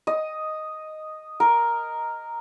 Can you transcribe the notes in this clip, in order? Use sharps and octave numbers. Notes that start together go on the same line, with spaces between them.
D#5
A#4